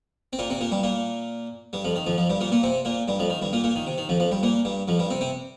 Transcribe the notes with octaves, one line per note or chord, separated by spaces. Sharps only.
C4
A#2 A#3
C3 C4
A#2 A#3
G2 G3
A#2 A#3
G2 G3
F2 F3
D#3
F2 F3
F2 F3
G2 G3
A#2 A#3
A#2 A#3
C3 C4
A#2 A#3
G2 G3
F2 F3
D#3
G2 G3
A#2 A#3
A#2 A#3
D#3
C3
D#3
F2 F3
F2 F3
G2 G3
A#2 A#3
G2 G3
F2 F3
G2 G3
C3 C4
C3 C4